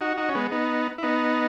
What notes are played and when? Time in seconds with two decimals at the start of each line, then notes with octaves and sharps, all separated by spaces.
0.01 D#4 F#4
0.18 D#4 F#4
0.29 C#4
0.35 G#3 B3
0.51 B3 D#4
0.98 E4
1.03 B3 D#4